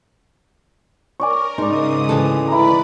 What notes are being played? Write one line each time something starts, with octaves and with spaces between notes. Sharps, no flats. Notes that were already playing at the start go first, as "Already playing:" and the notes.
A#4 C#5 D5 G#5
G#2 C#3 G#3 D#4 D5 D#6
D2 E3 A4
E4 B4 D5 A#5 B5